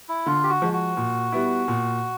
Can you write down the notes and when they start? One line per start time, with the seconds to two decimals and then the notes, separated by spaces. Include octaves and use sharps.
0.09 E4
0.26 D3 F4
0.43 G4
0.49 F#4
0.62 F3 G#3
0.73 F#4
0.97 A#2
1.32 G3 B3 E4
1.68 A#2